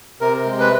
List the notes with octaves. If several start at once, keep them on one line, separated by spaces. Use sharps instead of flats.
C3 A#4
G#3
B4